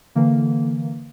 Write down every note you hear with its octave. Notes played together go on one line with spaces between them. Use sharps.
D3 E3 A#3